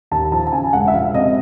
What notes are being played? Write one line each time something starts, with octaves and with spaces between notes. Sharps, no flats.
D#2 A5
F3 A5
A5
C#3 G#5
E1 F#5
E5
F3 F5
C3 D#5